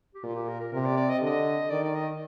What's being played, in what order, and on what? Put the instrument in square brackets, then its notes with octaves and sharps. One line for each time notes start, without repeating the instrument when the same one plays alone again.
[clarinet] G4
[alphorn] A#2 [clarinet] F4
[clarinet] G4
A#4
A#4
[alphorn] C3 [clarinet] A#4
[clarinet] D5
D5
D#5
[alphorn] D3 [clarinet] D#5
[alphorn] D#3 [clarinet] D5
[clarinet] D5
D#5